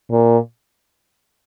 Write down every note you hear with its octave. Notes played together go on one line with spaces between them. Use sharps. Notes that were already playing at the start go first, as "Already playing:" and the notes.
A#2